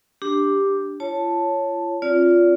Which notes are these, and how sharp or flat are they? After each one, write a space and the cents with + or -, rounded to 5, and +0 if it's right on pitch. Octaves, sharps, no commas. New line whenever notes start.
D4 +0 G4 +5
F4 -35 C#5 +0 A5 +0
C4 +45 F4 +0 D5 -35